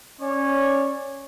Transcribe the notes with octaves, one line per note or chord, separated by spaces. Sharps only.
C#4 C#5 D5